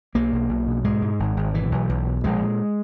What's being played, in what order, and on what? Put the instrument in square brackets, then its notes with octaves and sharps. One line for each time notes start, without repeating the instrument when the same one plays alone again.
[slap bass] B1 A#3
B1
B1
B2
G#2 G#3
G#2
G#1
G#1
B2 E3
B1
B1
B2
A#1 G#3
A#2